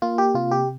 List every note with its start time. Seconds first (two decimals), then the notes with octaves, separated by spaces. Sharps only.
0.02 A#3 F4
0.18 G4
0.35 C3 F4
0.51 G4